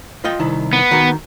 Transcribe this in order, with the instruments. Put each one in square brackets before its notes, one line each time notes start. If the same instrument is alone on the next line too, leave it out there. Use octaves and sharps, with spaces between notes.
[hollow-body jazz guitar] F4 D#5 G5
C2 D#3 E4
[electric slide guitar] B3
[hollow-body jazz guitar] D#3 F#4 A#4